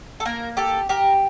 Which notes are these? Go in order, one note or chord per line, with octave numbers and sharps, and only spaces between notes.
A4
A#3 A#4
G4 A4
G4 A#4